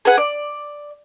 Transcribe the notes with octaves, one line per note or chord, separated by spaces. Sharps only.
G#4 B4 F#5
D5